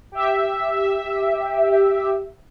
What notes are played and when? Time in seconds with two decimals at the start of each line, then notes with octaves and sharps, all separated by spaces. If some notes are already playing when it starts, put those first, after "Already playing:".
0.12 G4 E5